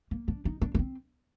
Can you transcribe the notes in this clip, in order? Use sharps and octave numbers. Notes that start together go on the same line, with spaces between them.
A#3
D4
D#4
D4
D4
C4